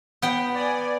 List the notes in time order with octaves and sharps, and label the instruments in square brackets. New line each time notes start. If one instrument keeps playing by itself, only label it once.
[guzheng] B3 G5
[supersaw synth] D5 G#5